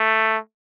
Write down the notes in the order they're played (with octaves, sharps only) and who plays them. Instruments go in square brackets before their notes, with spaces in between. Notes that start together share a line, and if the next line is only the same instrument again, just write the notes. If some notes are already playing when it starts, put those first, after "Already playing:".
Already playing: [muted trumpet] A3